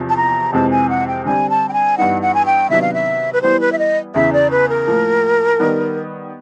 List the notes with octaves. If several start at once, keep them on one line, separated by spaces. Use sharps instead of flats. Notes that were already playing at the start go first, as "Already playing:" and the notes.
Already playing: E2 C3 F3
A5
A#5
F2 C3 E3 G#3 C4 A5
G#5
F#5
G5
D3 G3 C4 G#5
A5
G5
G#5
G2 E3 G3 B3 D#4 F#5
F#5
G#5
G5
C3 D#3 F#3 B3 D4 E5
F5
E5
B4
E3 G3 B3 E4 C5
B4
E5
D#5
E2 C#3 E3 E5
D5
B4
A#4
A2 F3 A#3
D#3 G3 B3